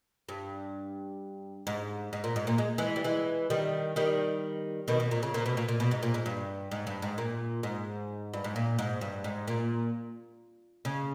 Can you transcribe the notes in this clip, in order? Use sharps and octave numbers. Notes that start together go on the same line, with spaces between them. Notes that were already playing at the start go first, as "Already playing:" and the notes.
G2
G#2
G#2
A#2
G#2
A#2
G#3
E3 G#3
G3
E3 G#3
D#3 G3
D#3 G3
B2 D#3
B2
A#2
C#3
A#2
B2
A#2
A#2
B2
G#2
A#2
G#2
G2
G#2
G2
G#2
A#2
G#2
G2
G#2
A#2
G#2
G2
G#2
A#2
C#3